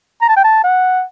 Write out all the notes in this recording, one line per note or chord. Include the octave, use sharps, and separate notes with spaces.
A#5
A5
G5
A5
F#5